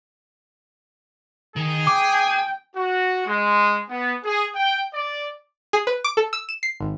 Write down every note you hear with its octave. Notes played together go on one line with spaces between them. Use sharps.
D#3 G#4
G5 G#5 D6
F#4
G#3
B3
G#4
G5
D5
G#4
B4
D6
A4
E6
E7
C7
G#1